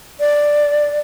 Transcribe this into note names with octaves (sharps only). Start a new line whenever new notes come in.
D5